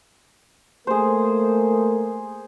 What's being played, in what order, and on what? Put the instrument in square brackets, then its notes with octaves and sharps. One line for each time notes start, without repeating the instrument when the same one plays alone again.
[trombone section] A3 A#3 A#4 [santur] G#4 C5